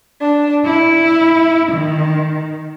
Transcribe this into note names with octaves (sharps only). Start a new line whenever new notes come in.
D4
E4
D#3